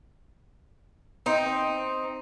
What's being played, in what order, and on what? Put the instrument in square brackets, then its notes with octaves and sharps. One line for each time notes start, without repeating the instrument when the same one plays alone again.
[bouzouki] C4 D#4